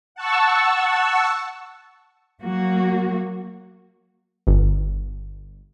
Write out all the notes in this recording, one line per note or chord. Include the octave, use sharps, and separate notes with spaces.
F#5 A5 C#6 E6
F#3 A#3 F#4
G1